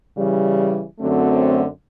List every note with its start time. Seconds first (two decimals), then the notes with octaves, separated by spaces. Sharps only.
0.17 C#3 E3 G3
0.99 F#2 D3 F#3 A3 C4